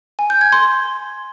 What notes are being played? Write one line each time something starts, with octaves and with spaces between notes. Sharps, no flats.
G#5
G6
G#6
C6